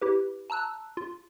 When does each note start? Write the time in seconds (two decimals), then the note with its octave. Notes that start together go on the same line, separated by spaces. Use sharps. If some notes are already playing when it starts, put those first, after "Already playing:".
0.02 E4 G4 B4
0.50 A5 A#5 E6 F#6
0.97 F4